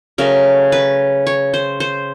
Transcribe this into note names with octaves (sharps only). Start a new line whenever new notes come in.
C#3 F#3 A3 A#4
B4
C#5
C5
C5